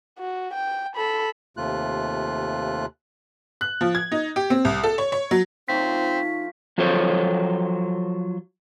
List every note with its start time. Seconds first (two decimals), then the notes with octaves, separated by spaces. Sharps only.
0.19 F#4
0.54 G5
0.96 A4 B5
1.57 D#2 C3 A3 F4 F#6
3.61 F#6
3.81 F3
3.95 G#6
4.12 D#4
4.36 G4
4.50 C4
4.65 C2
4.84 A4
4.98 C#5
5.12 C#5
5.31 F#3
5.68 F3 A3 C4 C#4 D#4 B6
6.78 F3 F#3 F4 A4 C5 C#5